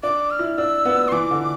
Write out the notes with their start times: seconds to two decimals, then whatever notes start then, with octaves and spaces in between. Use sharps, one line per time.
0.03 D4 D6
0.31 F6
0.39 E4
0.58 D4 E6
0.85 B3
1.08 C6
1.12 E3 D6
1.31 D3